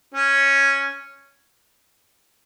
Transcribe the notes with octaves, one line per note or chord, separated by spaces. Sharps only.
C#4